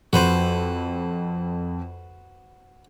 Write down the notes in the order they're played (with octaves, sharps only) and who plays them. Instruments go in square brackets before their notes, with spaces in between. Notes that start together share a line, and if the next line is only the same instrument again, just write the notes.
[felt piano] F2 [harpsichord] F#4 B4 C5